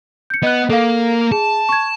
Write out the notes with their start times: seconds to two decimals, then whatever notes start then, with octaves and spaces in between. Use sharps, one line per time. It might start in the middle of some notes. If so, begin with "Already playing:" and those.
0.30 G6 C#7
0.43 B3 D#5 F#6
0.70 A#3 A4 F5
1.32 G#4 A5
1.69 C#6 G#6